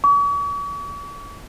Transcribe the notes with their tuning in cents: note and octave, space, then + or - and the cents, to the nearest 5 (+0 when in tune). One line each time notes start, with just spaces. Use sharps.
C#6 +45